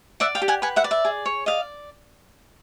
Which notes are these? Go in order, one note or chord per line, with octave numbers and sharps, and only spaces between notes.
D5 E5 F#5
F5 G5
G4
F#5 G#5
B4 F#5 G#5
E5 F#5
D5
E5
G#4
C#5
D5 D#5 F5